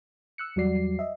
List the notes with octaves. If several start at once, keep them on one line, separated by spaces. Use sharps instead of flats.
E6 F#6 C#7
E2 F#3 G3 F#4 D5 C7
D#5 E5